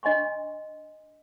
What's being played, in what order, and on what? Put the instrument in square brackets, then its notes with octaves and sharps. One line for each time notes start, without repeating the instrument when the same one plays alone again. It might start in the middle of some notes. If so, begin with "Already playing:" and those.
[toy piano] D4 D#5 G#5 C6 C#6